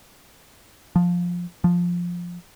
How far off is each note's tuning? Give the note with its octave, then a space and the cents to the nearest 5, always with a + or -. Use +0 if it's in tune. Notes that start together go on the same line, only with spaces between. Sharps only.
F3 +10
F3 +5